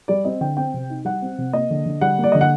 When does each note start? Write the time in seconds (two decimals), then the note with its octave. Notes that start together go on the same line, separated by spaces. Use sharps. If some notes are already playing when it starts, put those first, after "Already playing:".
0.08 G3 D5
0.25 C4 D#5
0.41 D3 G5
0.57 C4 G5
0.74 C3
0.90 D#4
1.05 G3 F#5
1.22 C4
1.38 C3
1.53 A#3 D#5
1.70 D3
1.86 D3
2.01 G3 F#5
2.18 A#3
2.24 D5
2.32 D3 D#5
2.41 F#5